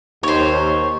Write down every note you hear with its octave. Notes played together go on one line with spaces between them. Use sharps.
D#2 C5 C#5